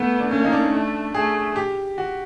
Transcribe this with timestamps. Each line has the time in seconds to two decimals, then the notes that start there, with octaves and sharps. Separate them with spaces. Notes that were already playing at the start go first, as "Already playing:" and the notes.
Already playing: A3 B3
0.20 D4
0.30 A#3 C#4
0.45 D#4
0.52 D4
0.73 A3
1.14 A3 G#4
1.56 G4
1.98 F#4